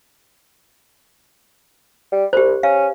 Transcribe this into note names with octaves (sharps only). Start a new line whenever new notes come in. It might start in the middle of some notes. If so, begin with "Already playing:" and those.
G3
C2 G4 C5
C#4 F5